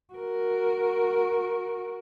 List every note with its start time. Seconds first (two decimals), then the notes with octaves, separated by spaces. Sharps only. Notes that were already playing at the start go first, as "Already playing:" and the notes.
0.13 F#4 A#4